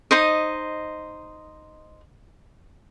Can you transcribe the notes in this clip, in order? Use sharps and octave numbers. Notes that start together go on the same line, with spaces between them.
D#4 C5 D#5